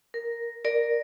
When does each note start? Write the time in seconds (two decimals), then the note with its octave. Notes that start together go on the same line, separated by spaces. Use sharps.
0.14 A#4
0.65 A#4 D5